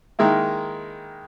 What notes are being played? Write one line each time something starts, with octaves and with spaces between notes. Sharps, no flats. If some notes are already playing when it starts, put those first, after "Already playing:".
D#3 G#3 A#3 E4